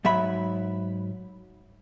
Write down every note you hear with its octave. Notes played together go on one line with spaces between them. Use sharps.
G#2 F#3 E5 B5